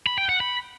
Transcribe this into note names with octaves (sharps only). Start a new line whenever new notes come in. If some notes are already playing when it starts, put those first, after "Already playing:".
B5
G5
F#5
B5